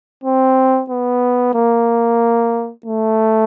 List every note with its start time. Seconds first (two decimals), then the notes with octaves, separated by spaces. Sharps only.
0.24 C4
0.90 B3
1.54 A#3
2.86 A3